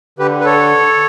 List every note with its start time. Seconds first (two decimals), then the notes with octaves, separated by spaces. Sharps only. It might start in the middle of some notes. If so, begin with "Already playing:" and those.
0.19 D3 G4 B4
0.40 B4
0.45 A4 C#5